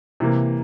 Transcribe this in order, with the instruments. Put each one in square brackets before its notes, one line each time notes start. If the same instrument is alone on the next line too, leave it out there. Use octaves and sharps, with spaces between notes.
[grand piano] C3 E3 A#3